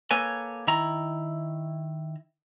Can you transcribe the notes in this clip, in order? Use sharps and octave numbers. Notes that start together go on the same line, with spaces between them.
A#3 A4 B4 C#5 G#5
D#3 E4 A#5